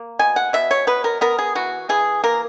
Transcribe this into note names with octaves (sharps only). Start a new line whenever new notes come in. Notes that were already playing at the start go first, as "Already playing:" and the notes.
Already playing: A#3
B2 G#5
F#5
B2 E5
C#5
B3 B4
A#4
B3 A#4
G#4
E3 F#4
E3 G#4
A#3 A#4